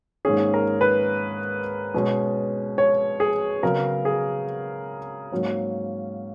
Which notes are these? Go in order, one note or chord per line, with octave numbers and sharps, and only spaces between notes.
G#2 D#3 A#3 C#4 G#4
A#4
B4
B2 G#3 C#4
C#5
G#4
C#3 F#3 B3 A#4
G#4
G#2 F#3 A#3 C#4